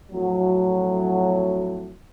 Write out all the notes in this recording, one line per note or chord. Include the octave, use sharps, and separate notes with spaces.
F2 A2 F#3